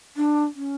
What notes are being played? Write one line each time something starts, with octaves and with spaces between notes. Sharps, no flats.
D4
C#4